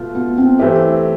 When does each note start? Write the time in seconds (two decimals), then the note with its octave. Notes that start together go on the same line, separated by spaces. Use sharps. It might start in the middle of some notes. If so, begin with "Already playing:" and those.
Already playing: B2 A3 F4
0.15 B3
0.38 C4
0.59 E3 A3 C4 E4 G4